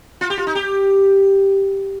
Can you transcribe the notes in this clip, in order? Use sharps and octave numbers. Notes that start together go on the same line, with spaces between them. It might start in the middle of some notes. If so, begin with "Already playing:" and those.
F4
G4
F4
D#4
G4